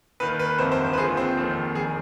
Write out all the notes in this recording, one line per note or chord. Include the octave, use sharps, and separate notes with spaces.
D#2 D#3 B4
B4
G1 F2 C3 D#3 C5
C5
C5
B4
D#2 D3 F3 G#4
C4
F1 D#2 D#3
F1 D#3 G#4